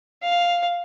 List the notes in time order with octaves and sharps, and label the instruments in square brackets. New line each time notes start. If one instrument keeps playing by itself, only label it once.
[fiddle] F5